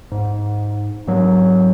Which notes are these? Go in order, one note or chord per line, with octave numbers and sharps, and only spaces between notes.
G#2
G#2 F#3